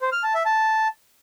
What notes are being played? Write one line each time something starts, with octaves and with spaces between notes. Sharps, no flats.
C5
F6
A5
E5
A5